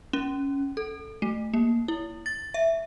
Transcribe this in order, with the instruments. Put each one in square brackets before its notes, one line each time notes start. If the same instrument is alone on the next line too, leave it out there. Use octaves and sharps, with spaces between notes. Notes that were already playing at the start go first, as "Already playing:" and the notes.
[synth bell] C#4
A4
A3
A#3
E4
A6
E5